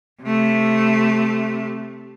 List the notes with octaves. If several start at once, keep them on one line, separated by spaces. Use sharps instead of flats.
C3 A3